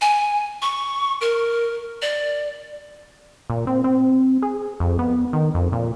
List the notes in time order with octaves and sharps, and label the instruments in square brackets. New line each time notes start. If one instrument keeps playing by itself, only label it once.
[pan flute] G#5
C#6
A#4
D5
[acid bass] A#2
C4
C4
G#4
F2
B3
D#3
F2
A#2